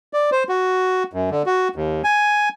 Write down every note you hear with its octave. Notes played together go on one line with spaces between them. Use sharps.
D5
C5
F#4
F#2
D3
F#4
D#2
G#5